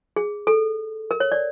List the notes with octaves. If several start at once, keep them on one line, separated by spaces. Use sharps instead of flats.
G#4
A4
A#4
C#5
D5